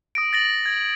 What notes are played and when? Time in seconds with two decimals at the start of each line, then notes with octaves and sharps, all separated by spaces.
0.15 D#6 A#6 D7
0.33 A6 A#6 F#7
0.66 G#6